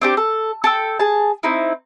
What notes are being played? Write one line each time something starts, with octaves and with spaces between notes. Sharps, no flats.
C4 D4 G4 D6
A4
A4 G5 E6
G#4 A5
C4 D#4 E4